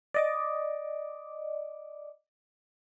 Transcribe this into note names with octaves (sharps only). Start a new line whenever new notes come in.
D5 D#5 D6